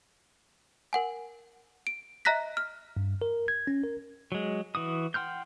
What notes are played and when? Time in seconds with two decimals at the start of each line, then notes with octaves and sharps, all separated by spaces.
0.93 A#4 F#5 G#5
1.87 D7
2.25 D#5 E5 A#5 F#6 A#6 B6
2.57 F6
2.97 G2
3.22 A#4
3.48 G#6
3.67 C#4
3.84 A#4
4.32 F#3 G#3
4.75 E3 F#4 D#6
5.14 F#5 G5 C6 F6 G6